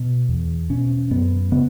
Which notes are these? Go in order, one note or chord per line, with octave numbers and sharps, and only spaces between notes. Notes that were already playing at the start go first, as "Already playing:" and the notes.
Already playing: B2
E2
B2 C#4
F#2 B3
C#3 B3